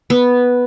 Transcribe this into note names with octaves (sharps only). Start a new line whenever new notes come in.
B3